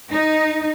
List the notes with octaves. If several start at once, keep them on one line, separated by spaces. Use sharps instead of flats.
D#4